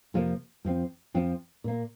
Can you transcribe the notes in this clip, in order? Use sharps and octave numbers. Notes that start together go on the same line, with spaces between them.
F2 C3 F3 A#3
F2 F3 C4
F2 F3 C4
A#2 A#3